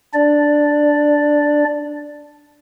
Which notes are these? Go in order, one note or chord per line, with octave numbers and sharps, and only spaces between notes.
D4 D5